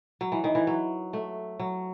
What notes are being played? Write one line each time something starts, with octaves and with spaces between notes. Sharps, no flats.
F#3
E3
D#3
E3
F#3
A3
F#3